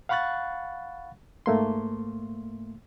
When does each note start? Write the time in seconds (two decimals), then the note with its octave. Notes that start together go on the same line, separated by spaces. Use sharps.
0.09 F5 F#5 B5 C#6 F#6 A6
1.46 G#2 A3 A#3 C6